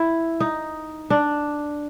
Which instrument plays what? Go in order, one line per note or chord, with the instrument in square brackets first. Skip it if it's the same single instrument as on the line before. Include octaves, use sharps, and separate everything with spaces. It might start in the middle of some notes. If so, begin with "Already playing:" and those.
Already playing: [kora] E4
D#4
D4